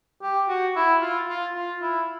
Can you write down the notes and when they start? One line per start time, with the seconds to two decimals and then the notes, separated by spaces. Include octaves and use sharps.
0.22 G4
0.48 F#4
0.76 E4
1.02 F4
1.29 F4
1.55 F4
1.82 E4